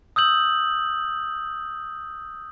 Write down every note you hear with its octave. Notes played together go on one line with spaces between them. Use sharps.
D#6 E6 G6 F#7